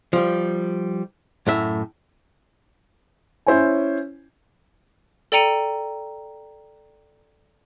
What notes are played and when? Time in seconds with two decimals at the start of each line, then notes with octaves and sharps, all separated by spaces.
0.13 F3 G3
1.47 F#2 A2 E5
3.46 C#4 E4 C5 C#5 G#5
5.32 A4 D5 G5 A#5 C#7 D#7